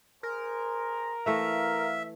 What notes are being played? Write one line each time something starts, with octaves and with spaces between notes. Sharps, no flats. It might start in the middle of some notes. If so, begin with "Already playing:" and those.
G#4 A#4 C5
E3 A3 E5 F5